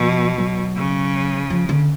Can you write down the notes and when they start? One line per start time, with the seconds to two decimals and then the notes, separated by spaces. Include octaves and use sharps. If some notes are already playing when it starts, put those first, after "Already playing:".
Already playing: B2 F3
0.38 F#3
0.76 C#3
1.50 F3
1.69 D3